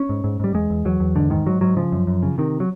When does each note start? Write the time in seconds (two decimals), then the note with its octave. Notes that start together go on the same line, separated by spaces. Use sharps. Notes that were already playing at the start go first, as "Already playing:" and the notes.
Already playing: C#4
0.09 G#2
0.24 G#2
0.40 G#2 G3
0.54 E2 G#3
0.70 E2
0.85 E2 F#3
1.00 E2
1.15 G#2 D3
1.30 G#2 D#3
1.46 G#2 F#3
1.61 G#2 F#3
1.77 C#3 F3
1.92 F#2
2.07 F#2
2.23 C#3
2.38 C3 D#3
2.60 F#3